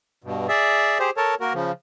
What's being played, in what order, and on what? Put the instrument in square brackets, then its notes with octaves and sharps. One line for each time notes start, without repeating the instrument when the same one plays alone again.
[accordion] G2 B2
G#4 D5 E5
G4 G#4 C5
A4 A#4 C#5 A5
A#3 F#4 A#4
C#3 F3